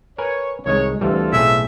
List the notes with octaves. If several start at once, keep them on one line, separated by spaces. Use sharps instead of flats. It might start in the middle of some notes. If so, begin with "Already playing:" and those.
A#4 B4 C#5 G#5
C2 D#3 G#3 C#5
D2 E3 G3 C4 F4 A4
B1 A2 G#4 E5